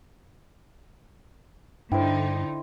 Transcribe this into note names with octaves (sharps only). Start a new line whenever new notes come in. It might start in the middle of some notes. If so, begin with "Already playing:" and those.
G2 D3 D#4 E4 C5 G5 D6